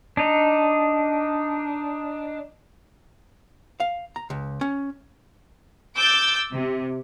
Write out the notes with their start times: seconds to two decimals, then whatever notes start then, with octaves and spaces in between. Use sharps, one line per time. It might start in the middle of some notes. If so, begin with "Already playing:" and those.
0.17 D4 D#4
3.80 F5
4.16 A#5
4.30 C#2
4.61 C#4
5.96 D6 E6 G6 A6
6.51 C3